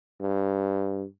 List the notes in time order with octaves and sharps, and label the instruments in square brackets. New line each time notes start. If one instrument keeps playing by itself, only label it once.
[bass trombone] G2